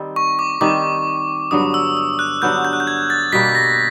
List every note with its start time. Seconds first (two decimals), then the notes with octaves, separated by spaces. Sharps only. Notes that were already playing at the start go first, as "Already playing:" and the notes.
Already playing: D#3 G3 C4 D#4
0.16 C#6
0.39 D6
0.61 D#3 G3 C4 D#4 D6
1.51 G2 D3 F#3 B3 D#6
1.74 E6
1.97 E6
2.19 F#6
2.42 G2 D3 F#3 B3 G6
2.65 G6
2.73 F#6
2.80 G6
2.87 G#6
3.10 A6
3.32 B2 G3 A#3 B6
3.55 A#6